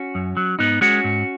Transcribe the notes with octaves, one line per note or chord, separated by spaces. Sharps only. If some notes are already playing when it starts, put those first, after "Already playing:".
Already playing: C#4 F#4
F#2
F#3
G#2 B3 D#4
G#3 C#4 F#4
G#2